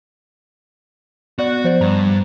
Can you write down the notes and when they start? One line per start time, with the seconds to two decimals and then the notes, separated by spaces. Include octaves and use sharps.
1.39 B3 F#4 D5 F#6
1.64 F3 C5 D5
1.81 G2 A#5